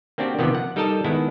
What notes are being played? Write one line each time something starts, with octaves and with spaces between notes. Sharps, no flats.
A#3 C4 D4 F#4 G4
C3 D#3 F3 A#3 B3 G4
F#5
G3 D#4 A4 A#4 D#5 A5
D#3 G#3 B3 E4